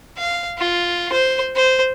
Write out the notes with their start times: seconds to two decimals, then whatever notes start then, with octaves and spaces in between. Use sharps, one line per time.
0.18 F5
0.59 F4
1.13 C5
1.56 C5